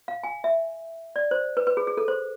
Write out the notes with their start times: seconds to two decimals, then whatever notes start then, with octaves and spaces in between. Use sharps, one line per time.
0.08 F5
0.23 G#5
0.44 E5
1.16 D5
1.31 C5
1.57 B4
1.67 B4
1.77 G#4
1.87 G#4
1.97 A4
2.08 C5